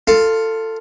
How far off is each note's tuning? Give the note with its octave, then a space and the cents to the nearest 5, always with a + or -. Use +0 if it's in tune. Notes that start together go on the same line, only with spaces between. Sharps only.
F4 +0 A4 +20